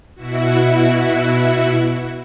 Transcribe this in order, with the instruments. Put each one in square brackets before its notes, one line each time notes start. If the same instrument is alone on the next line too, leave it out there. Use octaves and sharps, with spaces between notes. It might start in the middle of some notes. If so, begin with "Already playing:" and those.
[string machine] B2 E4 F#4